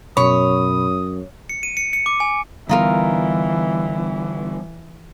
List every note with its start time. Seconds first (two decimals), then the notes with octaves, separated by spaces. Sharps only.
0.17 F#2 B2 C#5 B5 D#6
1.49 C#7
1.63 D#7
1.77 C#7
1.93 C#7
2.06 D6
2.20 G#5
2.69 D3 E3 G3 B3 D#4 F4 A#4